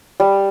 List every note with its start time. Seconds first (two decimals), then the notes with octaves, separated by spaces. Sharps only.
0.20 G3